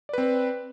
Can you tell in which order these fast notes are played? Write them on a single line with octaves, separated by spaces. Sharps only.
D5 B4 C4